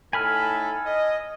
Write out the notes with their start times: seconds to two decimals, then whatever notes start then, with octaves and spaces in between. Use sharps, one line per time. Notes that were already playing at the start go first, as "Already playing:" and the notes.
0.13 A2 D#4 A4 G#5 B5 F6
0.86 D#5